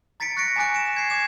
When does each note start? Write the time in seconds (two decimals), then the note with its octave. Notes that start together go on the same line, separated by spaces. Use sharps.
0.20 A#5 A6 B6 C#7 D7
0.36 C#6 F#6 A6 A#6 C#7 D7
0.56 G#5 A#5 D6 F#6 D7
0.74 D7 E7
0.96 G#6 C7
1.10 D6 G#6 E7